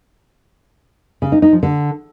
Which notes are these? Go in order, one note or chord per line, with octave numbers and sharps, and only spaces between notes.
C#3
D#4
D#4
F3
D3